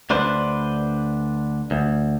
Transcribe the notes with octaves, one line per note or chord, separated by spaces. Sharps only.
D2 D4 B4 C5
D2